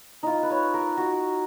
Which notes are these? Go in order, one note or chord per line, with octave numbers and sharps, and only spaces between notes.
D#4 F4
B4
C#5
A#4
F#4